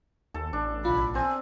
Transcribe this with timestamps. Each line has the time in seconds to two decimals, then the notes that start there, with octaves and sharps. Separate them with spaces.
0.34 D#2 A4
0.53 A1 D4
0.85 B1 F4 B5
1.15 C4 G#5